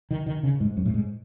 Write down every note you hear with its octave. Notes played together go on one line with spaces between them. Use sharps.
D#3
D#3
C#3
G#2
F#2
A2
G#2